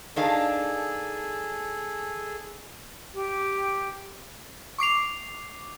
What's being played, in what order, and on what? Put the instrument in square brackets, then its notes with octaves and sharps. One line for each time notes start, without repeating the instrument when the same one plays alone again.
[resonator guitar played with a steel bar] D#3 D4 F5 [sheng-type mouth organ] G#4 A4
[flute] G4
[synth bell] C#6 D6 C7 F7